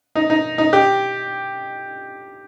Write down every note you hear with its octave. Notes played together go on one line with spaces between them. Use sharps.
D#4
D#4
D#4
G4